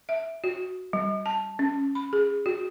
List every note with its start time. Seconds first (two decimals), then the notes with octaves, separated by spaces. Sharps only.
0.09 E5
0.44 F#4
0.93 G3
1.26 A5
1.59 C#4
1.95 B5
2.13 G#4
2.46 F#4